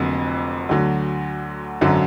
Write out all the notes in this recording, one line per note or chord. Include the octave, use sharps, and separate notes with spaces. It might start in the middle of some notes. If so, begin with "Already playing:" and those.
Already playing: F1 F2 D3 F#3 A#3
D2 D3 F#3
G#1 F#2 D3 F#3